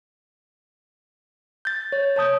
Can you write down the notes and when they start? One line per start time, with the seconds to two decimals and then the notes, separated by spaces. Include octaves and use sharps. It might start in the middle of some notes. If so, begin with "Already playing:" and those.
1.65 G6 A6
1.92 C#5
2.16 C#5 A5 D#6 G6